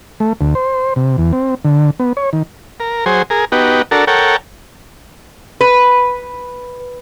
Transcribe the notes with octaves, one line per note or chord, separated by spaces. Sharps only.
A3
D2
C5
C3
E2
C4
D3
B3
C#5
D#3
A#4
F#3 G#4 C5
G#4 A#4
B3 D#4 F#4 G4
D4 F#4 A4 A#4
A4 A#4 C#5 F#5 G5
B4